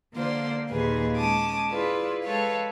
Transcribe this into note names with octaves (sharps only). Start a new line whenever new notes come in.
D3 A#3 F4 C5 D5
D#2 A#2 G#4 B4
G#3 C#4 A5 D6 D#6
E4 F4 G#4 B4 D5
G#3 A4 B4 C#5 F5